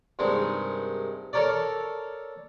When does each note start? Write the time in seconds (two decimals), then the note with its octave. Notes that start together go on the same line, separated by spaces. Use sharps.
0.19 G2 C3 D#3 G#3
1.33 A4 A#4 C#5 D5